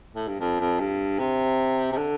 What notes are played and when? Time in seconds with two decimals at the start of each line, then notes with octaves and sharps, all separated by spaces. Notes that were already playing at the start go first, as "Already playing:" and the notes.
0.15 A2
0.27 G2
0.40 F2
0.60 F2
0.80 G2
1.19 C3
1.92 C3
1.97 D3